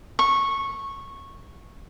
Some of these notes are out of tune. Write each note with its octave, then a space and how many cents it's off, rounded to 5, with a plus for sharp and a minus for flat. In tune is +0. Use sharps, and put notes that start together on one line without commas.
C#6 -10